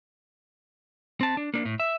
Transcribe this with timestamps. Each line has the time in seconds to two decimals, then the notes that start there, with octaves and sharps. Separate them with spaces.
1.21 C4 A5
1.37 D4
1.54 A#3 D4
1.66 A2
1.80 E5